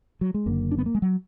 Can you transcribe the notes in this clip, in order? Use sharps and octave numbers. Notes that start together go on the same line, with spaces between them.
F#3
G#3
F#1 F#2 D3 A#3
D4
B3
A#3
G#3
F#3